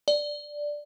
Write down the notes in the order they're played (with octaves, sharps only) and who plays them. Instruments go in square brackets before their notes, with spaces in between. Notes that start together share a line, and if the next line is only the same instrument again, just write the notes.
[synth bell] D5